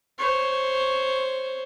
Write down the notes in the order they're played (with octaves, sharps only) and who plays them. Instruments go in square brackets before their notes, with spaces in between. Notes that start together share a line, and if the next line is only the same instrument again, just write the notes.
[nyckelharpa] C5 C#5